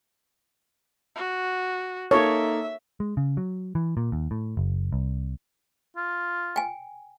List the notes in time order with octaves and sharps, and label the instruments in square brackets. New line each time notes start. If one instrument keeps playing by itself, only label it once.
[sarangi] F#4
[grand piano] A#3 D#4 A4 [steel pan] C#5 [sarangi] E5
[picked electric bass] G#3
C#3
F#3
E3
A#2
D#2
A2
F#1
C2
[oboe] F4
[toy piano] G5 G#5